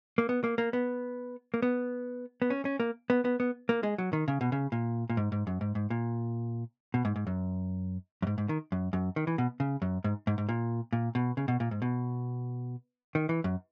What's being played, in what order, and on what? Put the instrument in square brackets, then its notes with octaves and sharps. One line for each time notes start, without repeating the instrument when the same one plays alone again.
[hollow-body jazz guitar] A#3
B3
A#3
A#3
B3
A#3
B3
B3
C#4
C#4
A#3
B3
B3
B3
A#3
G#3
F#3
D#3
C#3
B2
C#3
A#2
A#2
G#2
G#2
F#2
G#2
G#2
A#2
B2
G#2
G#2
F#2
F#2
G#2
G#2
D#3
F#2
F#2
D#3
E3
B2
C#3
F#2
G#2
G#2
G#2
A#2
A#2
B2
C#3
B2
A#2
G#2
B2
D#3
E3
F#2